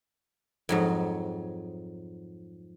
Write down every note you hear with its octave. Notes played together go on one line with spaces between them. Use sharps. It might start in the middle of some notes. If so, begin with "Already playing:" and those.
F2 G#2 F#3